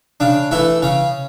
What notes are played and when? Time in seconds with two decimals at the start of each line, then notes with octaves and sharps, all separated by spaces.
0.20 C#3 D4
0.51 E3 A3 E4
0.82 C#3 C#4